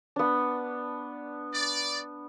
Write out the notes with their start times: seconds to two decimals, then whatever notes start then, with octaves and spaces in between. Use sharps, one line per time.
0.16 B3 D4
1.53 D5